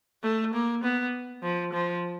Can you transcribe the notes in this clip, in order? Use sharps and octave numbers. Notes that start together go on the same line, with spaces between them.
A3
A#3
B3
F3
F3